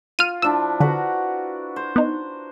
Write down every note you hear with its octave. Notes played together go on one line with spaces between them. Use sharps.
F4 F6 D#7
F3 D4 E4 E6
D3 F#4 B4 A#5
C5
B3 D#4